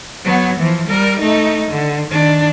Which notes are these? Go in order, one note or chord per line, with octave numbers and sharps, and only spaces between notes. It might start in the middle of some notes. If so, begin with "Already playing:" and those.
F#3 B3
E3 F3
G3 A#4
A3 D#4
D3
D#3 D4